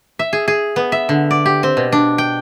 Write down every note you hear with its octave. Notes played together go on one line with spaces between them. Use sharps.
E5
G#4
G#4
B3
E5
D3
D5
G4
C4
B2
D4
G5